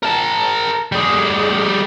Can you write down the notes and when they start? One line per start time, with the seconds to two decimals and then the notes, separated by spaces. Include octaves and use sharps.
0.03 A#4 A5
0.92 G3 G#4